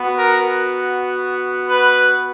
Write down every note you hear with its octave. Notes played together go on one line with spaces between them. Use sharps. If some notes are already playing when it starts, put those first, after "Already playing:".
Already playing: B3 F#4
A#4
B4